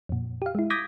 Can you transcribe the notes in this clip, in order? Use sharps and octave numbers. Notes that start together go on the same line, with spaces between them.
F2 A#2
G4 F5
G#3 E4
D6 D#6 G6 G#6 A#6 B6